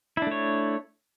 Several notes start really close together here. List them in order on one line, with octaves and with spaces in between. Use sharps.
E4 D4 A3 C#5